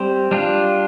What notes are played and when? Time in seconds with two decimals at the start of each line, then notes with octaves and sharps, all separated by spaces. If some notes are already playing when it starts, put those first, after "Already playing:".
Already playing: G3 C4 G4 C5
0.31 G3 D4 F4